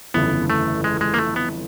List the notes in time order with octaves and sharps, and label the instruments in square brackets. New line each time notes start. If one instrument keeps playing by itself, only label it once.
[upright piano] G1 F2 C#3 E3 [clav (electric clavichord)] B3
[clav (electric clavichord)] A3
G#3
G#3
A#3
A3
B3